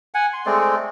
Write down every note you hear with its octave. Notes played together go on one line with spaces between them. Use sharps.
F#5 G#5
C6
G#3 A3 C4 D5